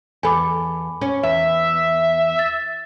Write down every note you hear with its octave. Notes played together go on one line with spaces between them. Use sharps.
E2 A4 G#5 B5 D6
C#4
E2 E5
A6